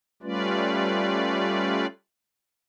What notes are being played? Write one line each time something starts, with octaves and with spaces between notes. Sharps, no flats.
G3 A3 C#4 F4 B4 D5